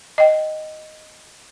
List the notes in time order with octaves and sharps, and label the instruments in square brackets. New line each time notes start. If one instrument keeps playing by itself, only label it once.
[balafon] D#5 G5